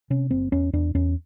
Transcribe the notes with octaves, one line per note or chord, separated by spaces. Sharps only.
C3 C#4
F#1 C4
E2 C#4
E2 D4
E2 C#4